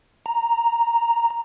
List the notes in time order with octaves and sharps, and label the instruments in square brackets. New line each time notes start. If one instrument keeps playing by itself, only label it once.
[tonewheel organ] A#5